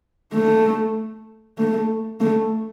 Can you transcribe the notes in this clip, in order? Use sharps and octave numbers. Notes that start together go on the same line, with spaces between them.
A3
A3
A3